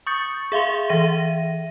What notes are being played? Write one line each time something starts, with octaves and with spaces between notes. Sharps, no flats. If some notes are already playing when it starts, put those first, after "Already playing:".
C#6 D#6 G6 A6 C#7
G#4 E5 F5 C6
E3 E5 A#6 D#7